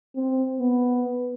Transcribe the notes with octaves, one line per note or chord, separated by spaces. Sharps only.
C4
B3